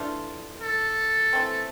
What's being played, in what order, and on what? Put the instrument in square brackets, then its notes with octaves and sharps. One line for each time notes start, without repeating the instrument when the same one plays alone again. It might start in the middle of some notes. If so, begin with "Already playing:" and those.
Already playing: [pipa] E3 A3 D4 F4
[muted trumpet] A4
[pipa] E3 A3 C4